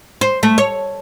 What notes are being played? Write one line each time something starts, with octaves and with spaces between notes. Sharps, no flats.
C5
A3
C#5